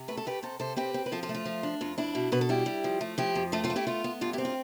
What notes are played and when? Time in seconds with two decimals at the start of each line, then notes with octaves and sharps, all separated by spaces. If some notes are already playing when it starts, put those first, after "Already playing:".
Already playing: C3
0.08 A3 B4
0.17 A4
0.26 A3 G4 B4
0.43 C3 A4 C5
0.59 C3 A4 C5
0.76 C4 G4 B4
0.94 C4
1.06 B4
1.12 F3 F4 A4
1.23 F4 A4
1.29 A3
1.35 F4
1.45 F3
1.63 D4
1.81 F2 F4
1.98 D4 E4
2.15 B2
2.32 B2 B4
2.41 A4
2.49 G3 E4 G4
2.66 G3
2.84 F3
3.01 A3
3.18 F3 E4 G4
3.36 F2
3.52 A3 F4 A4
3.64 F4 A4
3.70 A3
3.76 E4 G4
3.87 B3 F4
4.04 B3
4.21 G2 F4
4.33 E4 G4
4.38 C4
4.45 F4